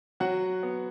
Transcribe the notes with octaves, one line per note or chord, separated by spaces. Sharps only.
F#3 F#4 F#5
B3